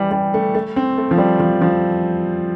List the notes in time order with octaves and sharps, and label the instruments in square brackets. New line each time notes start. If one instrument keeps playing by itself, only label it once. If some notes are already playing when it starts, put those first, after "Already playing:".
Already playing: [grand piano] E3 G3
G3
A3
A3
C4
A3
F3
G3
F3
F3